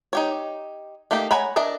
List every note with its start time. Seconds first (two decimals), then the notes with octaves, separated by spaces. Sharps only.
0.13 D#4 G4 C#5
1.11 A3 A#3 D#4 G4
1.31 C#5 F#5 G#5 A#5 B5
1.56 D4 A#4 D#5 E5